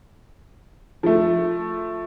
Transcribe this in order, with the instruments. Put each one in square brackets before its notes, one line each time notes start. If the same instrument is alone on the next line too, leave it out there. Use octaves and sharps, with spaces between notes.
[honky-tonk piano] F3 A3